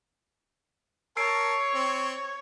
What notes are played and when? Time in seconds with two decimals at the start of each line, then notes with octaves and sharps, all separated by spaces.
1.17 A#4 C#5 A5 E6 C7 D7
1.74 C4